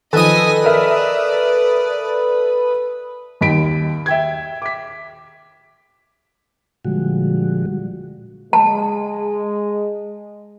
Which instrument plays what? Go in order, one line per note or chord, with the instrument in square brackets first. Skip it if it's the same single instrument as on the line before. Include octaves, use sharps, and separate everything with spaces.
[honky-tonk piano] D#3 F3 [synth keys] A4 D#6 [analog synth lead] B4 [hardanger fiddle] D#5 G#5
[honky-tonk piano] A#4 E5 [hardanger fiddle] D5
[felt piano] D#2 D#5 B5 B6 D7
E5 G5 G#6
D6 B6
[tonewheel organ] A#2 D3 F3 G3 G#3 F#4
[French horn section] G#3 [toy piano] A5